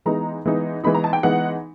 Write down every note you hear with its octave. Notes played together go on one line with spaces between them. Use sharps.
E3 G#3 B3 D#4 A#5
E3 G#3 B3 D#4
E3 G#3 B3 D#4 B5
A#5
A5
G5
E3 G#3 B3 D#4 F#5